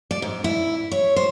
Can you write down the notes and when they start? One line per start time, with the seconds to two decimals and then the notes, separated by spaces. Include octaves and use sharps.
0.11 D5
0.22 G#2
0.44 E4
0.92 C#5
1.16 C5